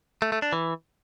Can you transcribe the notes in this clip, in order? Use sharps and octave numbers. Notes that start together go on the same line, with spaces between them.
A3
A3
D4
E3